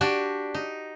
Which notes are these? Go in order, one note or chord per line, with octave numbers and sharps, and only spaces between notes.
D4 F#4 G4
D#4